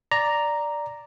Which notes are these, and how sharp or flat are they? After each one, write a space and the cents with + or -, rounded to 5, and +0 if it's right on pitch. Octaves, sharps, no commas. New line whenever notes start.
D5 +0 A#5 +0